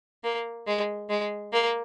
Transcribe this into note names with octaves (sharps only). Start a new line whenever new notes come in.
A#3
G#3
G#3
A#3